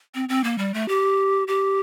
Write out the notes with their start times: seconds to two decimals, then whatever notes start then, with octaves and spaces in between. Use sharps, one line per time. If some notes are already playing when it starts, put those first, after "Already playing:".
0.15 C4
0.29 C4
0.44 A#3
0.58 G3
0.74 A3
0.88 G4
1.48 G4